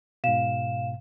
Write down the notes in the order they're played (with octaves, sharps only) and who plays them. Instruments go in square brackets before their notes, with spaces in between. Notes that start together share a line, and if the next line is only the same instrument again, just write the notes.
[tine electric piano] G#2 B2 [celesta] F5 E7